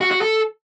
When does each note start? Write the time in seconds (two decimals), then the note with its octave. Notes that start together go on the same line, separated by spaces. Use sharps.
0.01 F#4
0.11 F#4
0.21 A4